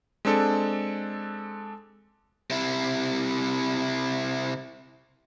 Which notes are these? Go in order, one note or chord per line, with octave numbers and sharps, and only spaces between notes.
G#3 C4 D4 A4
C3 E4